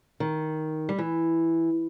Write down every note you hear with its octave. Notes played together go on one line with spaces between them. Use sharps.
D#3
G3
E3